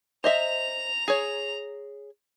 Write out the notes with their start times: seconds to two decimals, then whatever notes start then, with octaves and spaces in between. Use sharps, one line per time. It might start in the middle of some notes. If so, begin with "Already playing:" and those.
0.24 C5 D#5 E5 A#5 F7
1.08 G#4 C#5